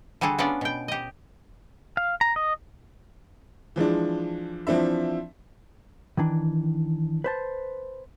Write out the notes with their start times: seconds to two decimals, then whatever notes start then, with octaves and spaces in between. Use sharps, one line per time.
0.21 D3 G3 F#4 G#4 A4
0.38 B3 C#4 D4 F4 A4 D5
0.61 B2 G5
0.88 G4 D#5
1.97 F5
2.21 A#5
2.36 D#5
3.76 E3 F3 G#3 D4
4.67 E3 F3 C4 D4 E5
6.17 D#3 E3 D4
7.24 B4 C5 A5